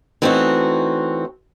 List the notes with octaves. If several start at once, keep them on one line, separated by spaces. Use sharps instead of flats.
E3 A3 C4 C#4 D#4 F#4